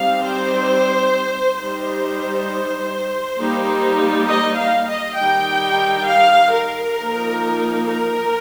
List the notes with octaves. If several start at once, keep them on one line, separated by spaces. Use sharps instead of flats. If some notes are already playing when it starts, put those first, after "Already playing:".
Already playing: G3 C4 D#4 F5
C5
G3 D#4 C5
G3 A#3 D#4
D#5
F5
D#5
D#3 G3 D#4 G5
F5
A#4
F3 A#3 D#4
A#4